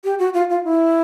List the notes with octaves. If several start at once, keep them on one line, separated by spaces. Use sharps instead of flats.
G4
F#4
F4
F4
E4